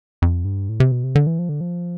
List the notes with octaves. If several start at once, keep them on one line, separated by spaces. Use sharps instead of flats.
F2
G2
A2
C3
B2
C3
D3
E3
F3
D3
F3